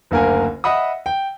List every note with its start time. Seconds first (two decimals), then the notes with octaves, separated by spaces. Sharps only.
0.11 F#1 D2 A#3 A#4 G#5
0.64 D#5 E5 F#5 B5 D#6
1.06 G5